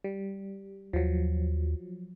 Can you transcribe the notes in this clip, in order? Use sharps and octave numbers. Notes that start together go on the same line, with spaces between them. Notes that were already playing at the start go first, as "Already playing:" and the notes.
G3
D#2 F3 F#3